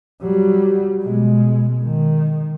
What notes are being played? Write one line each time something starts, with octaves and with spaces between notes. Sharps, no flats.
F#3 G3
B2 G#3
D#3